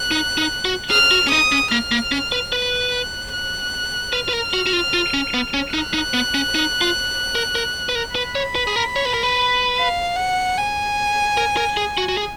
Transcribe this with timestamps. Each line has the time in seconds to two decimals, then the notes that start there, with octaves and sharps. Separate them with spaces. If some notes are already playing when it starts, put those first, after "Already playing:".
Already playing: F#6
0.11 D#4
0.37 D#4
0.65 F#4
0.91 G#4 F6
1.11 F#4
1.27 C#4
1.31 D#4 D#6
1.52 C#4
1.72 A#3 F6
1.92 A#3
2.12 C#4
2.32 B4
2.52 B4 F#6
3.33 F#6
4.13 B4 F6
4.29 B4
4.33 A#4
4.53 F#4
4.66 F#4
4.73 F4
4.94 F4
5.14 C#4
5.34 B3
5.54 C#4
5.74 D#4 F#6
5.94 D#4
6.14 B3
6.34 C#4
6.55 D#4
6.81 F4
7.35 A#4
7.55 A#4
7.89 B4
7.95 A#4
8.15 B4 B5
8.35 C#5
8.55 B4
8.67 G#4
8.76 A#4
8.96 C#5
9.05 B4
9.14 A#4
9.23 B4
9.77 F5
10.16 F#5
10.57 G#5
11.37 A#4
11.57 A#4
11.77 G#4
11.98 F#4
12.09 F#4
12.17 G#4